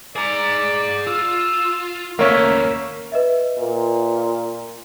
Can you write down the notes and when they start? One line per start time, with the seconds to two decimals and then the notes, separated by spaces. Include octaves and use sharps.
0.16 G#4 D5 A#5
1.07 F4 E6
2.19 D#2 A3 A#3 C#4 E5
3.12 B4 D#5 E5
3.58 A#2